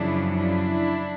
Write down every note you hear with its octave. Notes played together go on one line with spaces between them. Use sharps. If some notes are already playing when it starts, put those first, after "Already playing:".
Already playing: F#2 C#3 F3 D4 E4
D4 E4